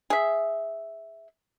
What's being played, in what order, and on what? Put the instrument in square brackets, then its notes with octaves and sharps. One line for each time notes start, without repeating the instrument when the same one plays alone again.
[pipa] G#4 E5